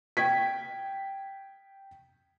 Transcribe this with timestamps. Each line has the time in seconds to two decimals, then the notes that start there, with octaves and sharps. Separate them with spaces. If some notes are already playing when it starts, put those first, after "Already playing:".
0.17 G5 G#6 B6